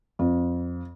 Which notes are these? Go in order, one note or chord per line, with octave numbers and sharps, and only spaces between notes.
F2